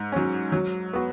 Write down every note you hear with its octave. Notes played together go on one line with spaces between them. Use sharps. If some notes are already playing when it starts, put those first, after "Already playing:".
Already playing: G#2
F#3 C#4
F#3
B3 F#4